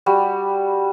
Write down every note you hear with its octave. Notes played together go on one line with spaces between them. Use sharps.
G3 F#4